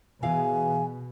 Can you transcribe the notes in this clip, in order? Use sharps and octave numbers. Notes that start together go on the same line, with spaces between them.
B2 E3 G#4 F5 G#5